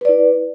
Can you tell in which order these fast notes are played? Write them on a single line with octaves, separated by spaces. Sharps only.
B4 D5 E4